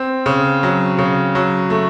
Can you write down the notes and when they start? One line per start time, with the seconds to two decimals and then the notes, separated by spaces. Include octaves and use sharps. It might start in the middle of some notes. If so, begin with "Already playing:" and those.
Already playing: C4
0.26 C#3
0.63 F#3
0.98 C#3
1.35 F#3
1.70 A3